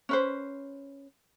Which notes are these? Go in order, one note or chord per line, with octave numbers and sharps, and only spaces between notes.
C#4 B4 C5